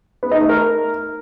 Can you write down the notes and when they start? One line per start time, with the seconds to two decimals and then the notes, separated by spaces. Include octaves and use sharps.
0.23 B3
0.32 D#4
0.40 A3
0.49 A#4